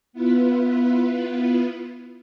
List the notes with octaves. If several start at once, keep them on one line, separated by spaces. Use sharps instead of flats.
B3 E4 F4 B4